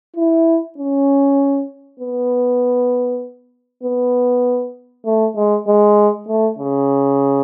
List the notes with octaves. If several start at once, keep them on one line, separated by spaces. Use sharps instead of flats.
E4
C#4
B3
B3
A3
G#3
G#3
A3
C#3